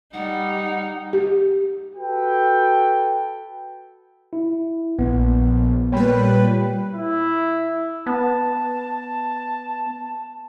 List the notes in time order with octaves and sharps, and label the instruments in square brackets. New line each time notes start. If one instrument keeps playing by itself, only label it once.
[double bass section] G3 [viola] D#4 [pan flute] F#5
[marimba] G4
[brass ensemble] F#4 A4 B4 G5
[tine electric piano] E4
[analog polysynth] A#1 [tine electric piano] B3
[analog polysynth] A#2 G3 B4 [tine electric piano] C#5 G5 B5
[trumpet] E4
[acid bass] B3 [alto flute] A5